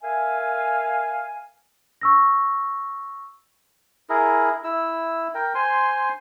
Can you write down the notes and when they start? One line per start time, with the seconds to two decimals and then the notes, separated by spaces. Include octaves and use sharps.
0.02 A#4 E5 F5 G#5
2.01 C#6 E6 A#6
4.10 E4 G#4 A#4
4.64 E4 E6
5.35 A#4 G5
5.55 C5 G#5 C6